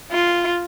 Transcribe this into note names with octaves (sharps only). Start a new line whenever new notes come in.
F4